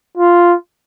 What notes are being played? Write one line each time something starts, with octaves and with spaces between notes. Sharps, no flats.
F4